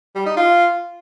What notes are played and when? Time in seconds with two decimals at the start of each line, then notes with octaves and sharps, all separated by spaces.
0.15 G3
0.26 D#4
0.37 F4